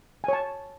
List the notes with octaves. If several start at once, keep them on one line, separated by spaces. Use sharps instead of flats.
C#5 G#5 A5